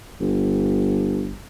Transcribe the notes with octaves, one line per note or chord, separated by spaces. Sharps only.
G1